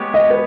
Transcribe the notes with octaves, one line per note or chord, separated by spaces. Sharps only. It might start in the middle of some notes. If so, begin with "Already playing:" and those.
Already playing: G#3 B3 G4 C#5
D#5
B4